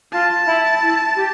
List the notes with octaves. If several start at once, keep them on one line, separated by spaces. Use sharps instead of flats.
F4 A5
E4
E4
G4